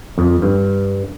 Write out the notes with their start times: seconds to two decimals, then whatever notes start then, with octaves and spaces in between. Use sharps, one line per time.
0.18 F2
0.42 G2